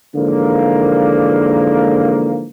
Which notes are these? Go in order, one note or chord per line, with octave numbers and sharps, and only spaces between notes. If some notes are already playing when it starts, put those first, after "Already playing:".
G#2 D3 E3 F3 A#3